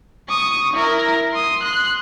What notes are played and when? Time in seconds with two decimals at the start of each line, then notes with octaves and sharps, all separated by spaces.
0.28 C#6 D#6
0.74 E4 A#4
1.33 C6 D#6
1.63 C6 F#6